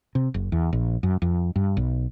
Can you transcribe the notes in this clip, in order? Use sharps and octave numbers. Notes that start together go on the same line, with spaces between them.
C3
F#1
E2
A#1
F#2
F2
G2
B1